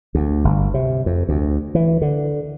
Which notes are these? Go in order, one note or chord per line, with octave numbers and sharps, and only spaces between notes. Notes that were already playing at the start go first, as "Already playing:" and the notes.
D2
G1
C3
F2
D2
E3
D3